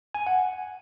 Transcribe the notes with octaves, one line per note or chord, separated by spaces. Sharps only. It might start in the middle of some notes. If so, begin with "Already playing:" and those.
G#5
F#5